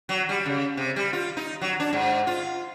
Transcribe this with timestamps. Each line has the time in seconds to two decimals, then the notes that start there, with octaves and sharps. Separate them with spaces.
0.09 F#3
0.29 G3
0.46 C#3
0.77 C3
0.96 G3
1.13 F4
1.37 D#4
1.61 F#3
1.80 D4
1.93 G#2
2.27 F4